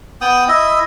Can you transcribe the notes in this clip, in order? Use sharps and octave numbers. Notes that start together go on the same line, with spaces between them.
B3 G5 D#6
E4 D#5